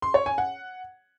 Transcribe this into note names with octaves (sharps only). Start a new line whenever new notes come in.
C6
C#5
G#5
F#5